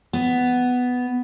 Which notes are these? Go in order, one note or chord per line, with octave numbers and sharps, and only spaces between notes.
B3